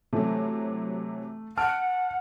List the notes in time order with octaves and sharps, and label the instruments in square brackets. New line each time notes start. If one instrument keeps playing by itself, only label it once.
[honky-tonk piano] C3 E3 F#3 [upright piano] A3
[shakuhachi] F#5 [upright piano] A5 F6 [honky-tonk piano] D7